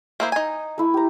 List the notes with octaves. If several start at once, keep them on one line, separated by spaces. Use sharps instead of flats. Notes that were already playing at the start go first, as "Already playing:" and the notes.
A#3 E4 C5 A#5 D#6
D#4 G#5
A3 E4
G4 A#5